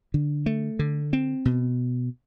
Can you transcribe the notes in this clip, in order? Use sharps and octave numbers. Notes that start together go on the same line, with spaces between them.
D3
A3
D3
C4
B2